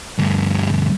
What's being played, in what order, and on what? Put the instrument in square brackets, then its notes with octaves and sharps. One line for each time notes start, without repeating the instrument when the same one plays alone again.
[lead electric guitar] D2 G2